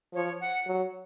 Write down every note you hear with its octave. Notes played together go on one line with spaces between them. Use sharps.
F3 C#5
F#5
F#3